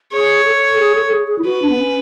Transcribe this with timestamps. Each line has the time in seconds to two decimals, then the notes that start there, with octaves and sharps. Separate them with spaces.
0.12 G#4 C#5
0.45 A4
0.79 G#4
0.96 A4
1.11 G#4
1.28 G#4
1.38 E4
1.45 F#4 B4
1.62 D4
1.70 B3
1.78 C#4